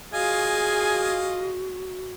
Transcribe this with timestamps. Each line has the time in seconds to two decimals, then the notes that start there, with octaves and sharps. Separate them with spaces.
0.13 F4 F#4 G#4 D#5 F5 G#5